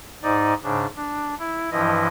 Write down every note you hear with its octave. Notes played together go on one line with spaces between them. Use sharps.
G#2 D#4 D5
G#2 C#3 D4
D4
E4
G2 E3 F3 E4 D#5